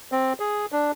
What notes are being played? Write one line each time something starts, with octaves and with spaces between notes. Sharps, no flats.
C4
G#4
D4